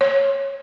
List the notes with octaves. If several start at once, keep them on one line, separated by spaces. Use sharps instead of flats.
C#5